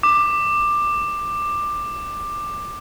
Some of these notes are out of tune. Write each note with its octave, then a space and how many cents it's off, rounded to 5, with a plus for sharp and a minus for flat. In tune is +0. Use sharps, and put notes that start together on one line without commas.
D6 +15